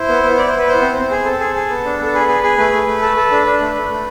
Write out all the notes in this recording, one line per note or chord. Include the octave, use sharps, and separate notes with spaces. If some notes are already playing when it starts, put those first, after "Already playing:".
Already playing: E4 C5
B3
B3
E4 D5
C5
B3
B4
B3 C5
C4
C4
G#4
C4 A4
G#4
G#4
B3
D4
B3 A4
G#4 B4
G#4
G#4
A3 B4
A3
A3
A4
A4
D4
D4
A3
A3
A3